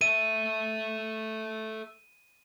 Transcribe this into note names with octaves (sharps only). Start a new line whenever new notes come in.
A4 E5 D#7